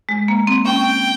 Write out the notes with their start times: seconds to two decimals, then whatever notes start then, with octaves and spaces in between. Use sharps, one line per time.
0.09 G#3
0.28 A#3
0.47 C4
0.66 C#4 G5